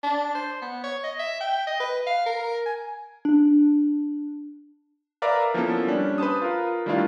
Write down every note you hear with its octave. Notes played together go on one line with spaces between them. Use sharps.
D4
C5
B3
C#5
D#5
E5
G5
D#5
B4
F5
A#4
G#5
D4
A#4 B4 D5 E5 F5 A#5
F3 A#3 B3 C#4 E4 A4
G3 C#4 D4
B4 C5 A5 D#6
F4 A#4 B4
D#3 G3 A3 D4 E4 F4